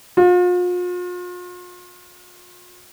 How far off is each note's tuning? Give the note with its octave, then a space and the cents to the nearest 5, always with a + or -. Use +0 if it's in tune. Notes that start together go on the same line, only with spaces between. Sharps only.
F4 +40